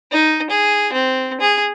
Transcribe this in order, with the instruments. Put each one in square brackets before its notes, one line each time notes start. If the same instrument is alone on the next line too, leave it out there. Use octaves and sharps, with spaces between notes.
[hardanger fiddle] D#4
G#4
C4
G#4